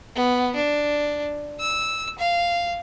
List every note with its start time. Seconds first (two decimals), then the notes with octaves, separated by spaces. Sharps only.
0.15 B3
0.55 D4
1.60 E6
2.19 F5